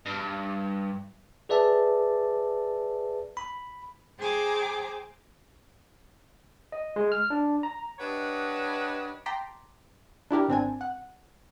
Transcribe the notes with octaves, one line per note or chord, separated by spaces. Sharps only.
G2
G#4 B4 D5 E5 A5
B5
G#4 C5 G5 G#5 A#5 D6
D#5
G#3
F6
D4
A#5
D4 G4 B4 C#5 D#5 F#5
G5 A5 A#5 C6 D6 B6
D4 E4 G4 A#4
G#1 C4 D4 G#5
F#5